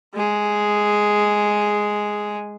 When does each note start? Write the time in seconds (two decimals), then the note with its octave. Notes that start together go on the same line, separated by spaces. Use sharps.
0.15 G#3 G#4